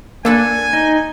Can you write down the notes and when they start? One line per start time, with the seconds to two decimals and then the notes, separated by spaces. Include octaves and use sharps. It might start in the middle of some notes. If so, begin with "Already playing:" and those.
0.25 A#3 D4 A4 B4 G#5 E6
0.73 D#4